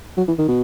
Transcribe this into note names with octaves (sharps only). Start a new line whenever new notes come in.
F#3
E3
D#3
B2